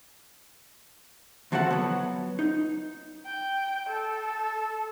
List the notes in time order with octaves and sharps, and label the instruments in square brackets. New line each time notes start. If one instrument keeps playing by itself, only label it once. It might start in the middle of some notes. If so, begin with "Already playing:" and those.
[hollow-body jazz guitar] D2 F3 F#4 A4 F#5
F#3 B3
D#4
[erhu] G5
A4